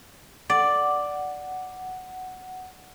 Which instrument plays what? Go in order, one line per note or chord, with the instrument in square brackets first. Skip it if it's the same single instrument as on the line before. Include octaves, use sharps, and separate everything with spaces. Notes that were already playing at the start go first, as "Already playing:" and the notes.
[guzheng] D5 [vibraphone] F#5